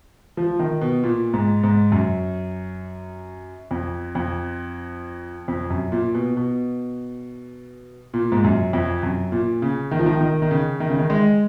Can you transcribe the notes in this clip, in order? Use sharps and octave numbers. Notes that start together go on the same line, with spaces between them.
F3
D#3
B2
A#2
G#2
G#2
F#2
F2
F2
F2
F#2
A#2
B2
B2
A#2
G#2
F#2
F2
F#2
A#2
C#3
D#3
F3
D#3
D#3
D#3
C#3
D#3
C#3
D#3
G#3